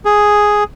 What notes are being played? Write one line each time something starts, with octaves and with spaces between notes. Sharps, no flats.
G#4